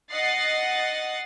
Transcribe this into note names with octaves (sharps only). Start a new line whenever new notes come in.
D#5 F#5 A6 C7